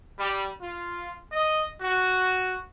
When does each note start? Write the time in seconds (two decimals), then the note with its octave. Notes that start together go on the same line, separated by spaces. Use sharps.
0.19 G3
0.61 F4
1.32 D#5
1.81 F#4